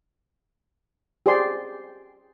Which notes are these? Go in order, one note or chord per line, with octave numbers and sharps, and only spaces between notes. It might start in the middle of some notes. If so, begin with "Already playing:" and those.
G4 G#4 C5 D5 C6